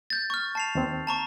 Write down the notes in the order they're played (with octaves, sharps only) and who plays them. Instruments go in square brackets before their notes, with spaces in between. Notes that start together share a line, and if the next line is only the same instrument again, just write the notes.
[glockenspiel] G6 A6
C#6 F6
A5 C7 F7
[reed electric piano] D#2 C4
[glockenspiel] A5 A#5 C#6